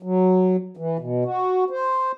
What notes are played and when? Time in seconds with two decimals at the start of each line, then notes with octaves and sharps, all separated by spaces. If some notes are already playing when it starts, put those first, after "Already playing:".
0.03 F#3
0.77 E3
0.99 B2
1.25 F#4
1.70 C5